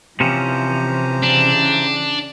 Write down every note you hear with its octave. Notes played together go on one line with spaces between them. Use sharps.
C3 E3 F3 C#4 G4 C5 A#5
C#3 E3 D4